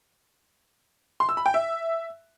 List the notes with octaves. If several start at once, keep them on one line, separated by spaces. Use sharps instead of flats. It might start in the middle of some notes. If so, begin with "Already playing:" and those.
C6
E6
B5
G5
E5